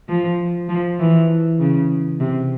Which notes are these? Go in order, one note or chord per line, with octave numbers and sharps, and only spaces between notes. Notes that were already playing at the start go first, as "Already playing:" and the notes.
F3
F3
E3
C#3
C3